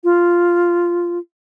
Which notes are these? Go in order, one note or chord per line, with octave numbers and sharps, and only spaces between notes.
F4